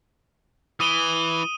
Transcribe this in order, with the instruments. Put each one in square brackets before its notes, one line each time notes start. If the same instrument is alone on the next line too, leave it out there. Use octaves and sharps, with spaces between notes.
[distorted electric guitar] E3 [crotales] D#6 D#7 G7